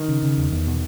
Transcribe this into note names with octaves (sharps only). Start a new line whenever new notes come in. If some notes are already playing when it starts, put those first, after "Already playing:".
Already playing: D#3
C#3
C#3
E2
E2
B2